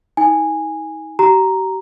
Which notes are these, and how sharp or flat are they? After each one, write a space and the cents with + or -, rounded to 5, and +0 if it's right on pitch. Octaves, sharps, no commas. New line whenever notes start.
D#4 +40 G#5 -10
G4 -40 A#5 +0